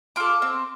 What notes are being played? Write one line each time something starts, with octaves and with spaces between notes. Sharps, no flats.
F4 A4 D6
C4